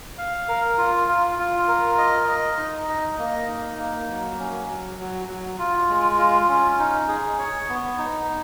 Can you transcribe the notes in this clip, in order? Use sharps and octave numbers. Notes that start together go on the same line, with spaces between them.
F5
A#4
F4
F4
F4
A#4
D#5
D#5
D#4
D#5
A#3
D#4
A#3
F#3
C#4
F#3
F#3
F#3
F4
G#3
F4
C#4
D#4
G#4
C#5
B3
D#4